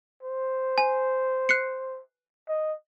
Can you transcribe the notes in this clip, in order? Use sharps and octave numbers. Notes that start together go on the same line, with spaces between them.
C5
G#5
F#6 C7 C#7
D#5